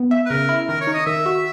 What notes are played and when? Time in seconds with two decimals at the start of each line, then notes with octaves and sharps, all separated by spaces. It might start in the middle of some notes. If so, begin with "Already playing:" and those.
Already playing: B3
0.11 E5
0.26 B4
0.30 C#3 A#4
0.49 E4
0.68 D#3 A#4
0.81 C#5
0.87 D#4
0.93 D#5
1.06 D#3 E5
1.26 F#4